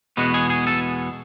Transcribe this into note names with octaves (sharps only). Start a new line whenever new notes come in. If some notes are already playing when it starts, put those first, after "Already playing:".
E2 B2 G#3 B3 F#4
G#4
G#4
A4